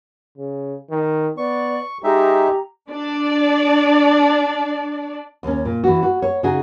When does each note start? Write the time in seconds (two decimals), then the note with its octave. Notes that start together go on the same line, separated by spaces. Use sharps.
0.38 C#3
0.90 D#3
1.37 B3 D5 C#6
2.04 G#3 D#4 G4 E5 A#5
2.90 D4 D5
5.43 D#2 C#4
5.65 A#2
5.84 E3 F#4
6.02 F#4
6.22 C#5
6.43 C#3 C#4 D#4 F#4 G#4